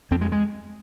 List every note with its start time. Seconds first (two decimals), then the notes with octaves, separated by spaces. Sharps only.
0.11 F2 C4
0.21 G#3
0.32 G#3